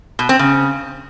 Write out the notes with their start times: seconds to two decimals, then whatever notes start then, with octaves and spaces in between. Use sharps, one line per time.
0.19 B2
0.29 C4
0.39 C#3